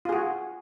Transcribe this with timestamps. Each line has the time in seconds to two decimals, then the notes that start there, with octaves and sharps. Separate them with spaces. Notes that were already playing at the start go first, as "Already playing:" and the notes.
0.05 F4
0.09 G#4
0.13 F#4